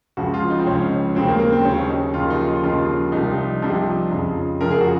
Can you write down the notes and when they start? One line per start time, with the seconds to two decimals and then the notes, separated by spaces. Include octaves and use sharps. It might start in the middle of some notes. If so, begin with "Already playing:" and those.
0.17 C#2 C#3 F3 F#4
0.34 F4
0.50 D#4
0.59 C4
0.67 C#2 C#3 F3 C#4
1.15 D#2 C#3 F#3 C4
1.28 A#3
1.40 A#3
1.53 C4
1.65 D#2 C#3 F#3 C#4
1.90 D#4
2.14 D#2 C#3 F3 F4
2.30 D#4
2.47 F4
2.63 D#2 C#3 F3 F4
3.12 C2 C3 F3 D#4
3.62 C2 C3 F3
4.11 F2 C#3 F3
4.60 F2 C#3 F3 A#4
4.71 G#4
4.81 F#4